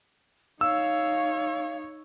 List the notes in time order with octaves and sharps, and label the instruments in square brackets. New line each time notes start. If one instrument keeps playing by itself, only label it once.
[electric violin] D#4 C#5 [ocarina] F5 [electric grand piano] E6